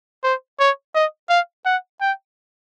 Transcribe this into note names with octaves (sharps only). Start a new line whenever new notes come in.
C5
C#5
D#5
F5
F#5
G5